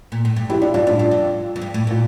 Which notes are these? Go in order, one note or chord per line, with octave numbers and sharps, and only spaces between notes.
A#2
A2
G2
F2 E4 G4
F2 D4 F4
G2 D4 F4
A2 D4 F4
G2
F2
F2
G2
A2
A#2 F4